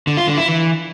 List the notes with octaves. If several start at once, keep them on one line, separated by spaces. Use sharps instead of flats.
D3
F4
D3
E4
E3